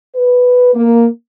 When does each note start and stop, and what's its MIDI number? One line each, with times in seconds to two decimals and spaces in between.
0.16 0.72 71
0.74 1.07 58